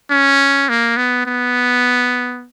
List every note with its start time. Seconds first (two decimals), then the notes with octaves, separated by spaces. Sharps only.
0.11 C#4
0.69 A#3
0.97 B3
1.26 B3